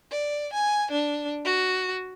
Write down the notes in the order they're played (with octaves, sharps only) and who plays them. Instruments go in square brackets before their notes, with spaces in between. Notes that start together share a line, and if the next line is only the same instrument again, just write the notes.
[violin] D5
G#5
D4
F#4